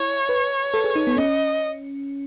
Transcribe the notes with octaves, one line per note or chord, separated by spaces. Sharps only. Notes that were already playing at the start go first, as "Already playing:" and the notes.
Already playing: E4 C#5
B4
A4
G#4
D#4
B3
C#4 D#5